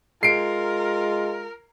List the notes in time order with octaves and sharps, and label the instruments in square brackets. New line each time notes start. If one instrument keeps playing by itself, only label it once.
[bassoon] G#3 [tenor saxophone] F4 [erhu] A#4 [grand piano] C7 D7